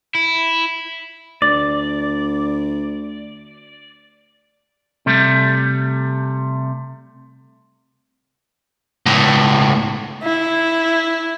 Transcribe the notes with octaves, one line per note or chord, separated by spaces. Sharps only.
E4
D2 D5 A6
C3 G3 A3
C#2 A2
E4